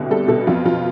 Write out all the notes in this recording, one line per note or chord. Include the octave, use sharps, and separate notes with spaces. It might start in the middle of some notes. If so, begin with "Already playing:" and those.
Already playing: C2 B2 D3 G4
G3 A4
B2 A4
F2 F4
F2 F4